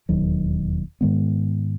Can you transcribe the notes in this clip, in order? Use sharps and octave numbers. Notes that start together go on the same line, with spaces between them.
E1 D#2 D#3 F#3
G#2 D#3 G#3 B3